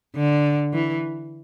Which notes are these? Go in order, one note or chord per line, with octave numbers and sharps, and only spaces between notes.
D3
E3